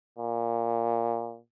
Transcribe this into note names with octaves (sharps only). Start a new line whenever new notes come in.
A#2